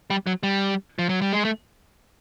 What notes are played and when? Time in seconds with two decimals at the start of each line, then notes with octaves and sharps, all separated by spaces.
0.10 G3
0.27 F#3
0.43 G3
0.99 F3
1.09 F#3
1.22 G3
1.33 G#3
1.45 A3